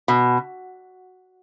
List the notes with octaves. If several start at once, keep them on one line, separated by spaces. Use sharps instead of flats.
B2